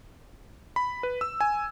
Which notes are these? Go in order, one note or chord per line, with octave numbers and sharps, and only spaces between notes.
B5
B4
E6
G#5